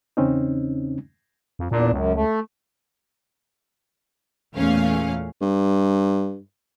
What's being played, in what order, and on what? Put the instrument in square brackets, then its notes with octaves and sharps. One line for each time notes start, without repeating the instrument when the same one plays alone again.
[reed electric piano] E2 C#3 C4 C#4 D#4
[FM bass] F2
[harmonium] E2 D4 [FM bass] A#2
[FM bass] C#2 [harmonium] F#2
[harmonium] A3
[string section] E2 A#2 A3 C#4 F5
[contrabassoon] G2